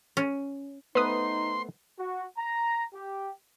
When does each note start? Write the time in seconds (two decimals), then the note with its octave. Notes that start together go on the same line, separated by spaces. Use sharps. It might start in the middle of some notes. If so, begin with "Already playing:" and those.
0.17 C#4
0.95 A3 B3 D#4 B4 C5 C6 D#6
1.97 F#4
2.38 A#5
2.93 G4